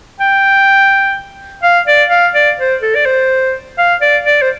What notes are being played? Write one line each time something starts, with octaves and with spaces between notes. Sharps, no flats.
G5
F5
D5
F5
D5
C5
A4
D5
C5
F5
D5
D5
C5